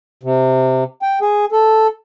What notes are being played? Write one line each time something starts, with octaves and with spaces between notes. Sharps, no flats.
C3
G5
G#4
A4